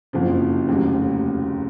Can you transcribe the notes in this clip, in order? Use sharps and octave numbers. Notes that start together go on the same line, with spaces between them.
F#1 F2 C#3 F3
F1 D#2 C#3 F#3